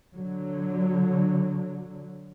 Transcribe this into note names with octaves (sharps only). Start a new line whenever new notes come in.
D3 F#3